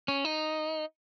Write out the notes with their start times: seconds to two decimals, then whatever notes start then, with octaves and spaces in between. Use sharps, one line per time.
0.08 C#4
0.25 D#4